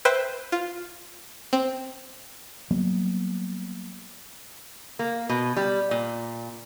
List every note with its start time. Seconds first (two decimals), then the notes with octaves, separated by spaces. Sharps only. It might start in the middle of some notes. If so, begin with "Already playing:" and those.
0.05 B4 C5 E5 G5
0.52 F4
1.53 C4
2.71 F#3 G3 A#3 B3
4.99 A#3
5.29 B2
5.56 G3
5.91 A#2